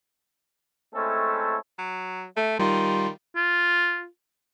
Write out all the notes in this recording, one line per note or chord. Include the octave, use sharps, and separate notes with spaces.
G#3 A3 C4 C#4 E4 A4
F#3
A3 E5
D#3 G3 F4 C6
F4